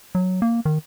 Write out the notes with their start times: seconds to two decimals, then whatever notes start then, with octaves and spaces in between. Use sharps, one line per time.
0.15 F#3
0.42 A#3
0.65 D#3